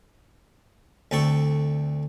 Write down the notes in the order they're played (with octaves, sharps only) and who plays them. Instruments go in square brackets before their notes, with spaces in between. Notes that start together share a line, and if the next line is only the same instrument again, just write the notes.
[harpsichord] D2 C4 A4 C#6